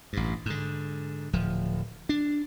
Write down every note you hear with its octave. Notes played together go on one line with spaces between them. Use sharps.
A1 G2
G#2 D3
D1 F3
D4